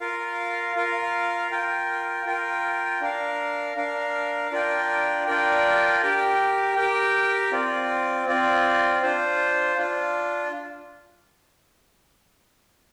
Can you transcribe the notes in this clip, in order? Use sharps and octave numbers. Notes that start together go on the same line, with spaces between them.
F4 A#4 F5
F4 A#4 F5
F4 A#4 G5
F4 A#4 G5
D4 A#4 F5
D4 A#4 F5
D4 F4 A#4 D5 G5
D4 F4 A#4 D5 G5
G4 A#4 G5
G4 A#4 G5
C4 F4 D5
C4 F4 D5
D4 F4 C5
D4 F4